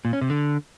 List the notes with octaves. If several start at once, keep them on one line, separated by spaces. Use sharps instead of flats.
A#2
C#4
C3
D3